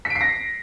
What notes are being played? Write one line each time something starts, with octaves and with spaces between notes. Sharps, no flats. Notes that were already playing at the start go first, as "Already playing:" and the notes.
B6
D7
C7
A#6